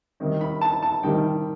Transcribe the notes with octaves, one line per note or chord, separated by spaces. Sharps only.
C3 D#3 G3 D#4
B5
A5
A5
C3 D#3 G3 D#4 G5